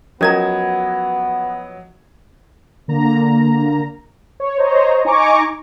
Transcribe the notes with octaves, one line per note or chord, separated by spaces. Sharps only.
F3 F#3 B3 C#4 A#4 D#5 A#5 G#6
D3 A#3 A#5
C#5
C5 C#5 D#5 A#5
D#4 G#5 A#5 C#6 D6